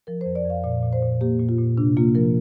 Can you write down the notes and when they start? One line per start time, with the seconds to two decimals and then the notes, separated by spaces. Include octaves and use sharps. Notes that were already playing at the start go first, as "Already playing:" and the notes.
0.07 F3 A#4
0.21 C5
0.26 F2
0.35 D5
0.45 F2
0.50 F5
0.64 A#2 D5
0.82 A#2
0.93 C5
1.02 A#2
1.21 A#3 G4
1.39 A#2
1.49 F4
1.58 A#2
1.78 C3 D4
1.97 A#3 F4
2.15 F3 A#4